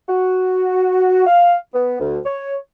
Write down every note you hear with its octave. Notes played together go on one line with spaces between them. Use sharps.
F#4
F5
B3
D2
C#5